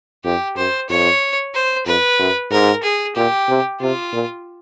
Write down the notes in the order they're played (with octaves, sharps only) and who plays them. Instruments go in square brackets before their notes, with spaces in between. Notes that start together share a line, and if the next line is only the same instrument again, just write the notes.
[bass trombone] F2 [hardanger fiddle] G4
[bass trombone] F#2 [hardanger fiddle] C5
[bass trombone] F2 [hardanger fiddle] C#5
[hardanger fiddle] C5
[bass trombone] F2 [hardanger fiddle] B4
[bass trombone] F#2
[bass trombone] G#2 [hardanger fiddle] A#4
[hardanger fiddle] G#4
[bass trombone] A#2 [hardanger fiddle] G4
[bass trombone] C3
[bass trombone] C3 [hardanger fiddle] F4
[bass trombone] A#2